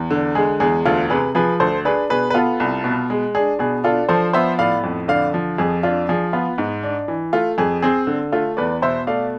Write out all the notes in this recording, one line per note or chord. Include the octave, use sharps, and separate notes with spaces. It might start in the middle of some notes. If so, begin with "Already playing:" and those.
Already playing: E2
D3
G#3 G#4
E2 G#4
D2 F4 A4
C3 G#4 B4
F3 G#4 B4
D2 A4 C5
D4 G#4 B4
B2 G#4 B4
B4
B3 F4 A4
C2
B2
G#3
D4 G#4
B2 G#4
D4 F4 A4
F3 A4 C5
B3 C5 E5
A2 D5 F5
F2
D3 D5 F5
F3
F2 G#4
D4 F4
F3 G#4
B3 F4
G#2
D4
E3
A3 F4
F2 G#4
C4 G#4
D3
A3 F4
E2 B4 D5
B2 C5 E5
A3 D5 F5